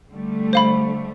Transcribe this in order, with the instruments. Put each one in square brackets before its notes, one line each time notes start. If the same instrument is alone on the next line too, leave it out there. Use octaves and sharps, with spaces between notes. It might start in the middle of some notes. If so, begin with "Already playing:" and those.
[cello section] D3 G3 A3
[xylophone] C5 F5 B5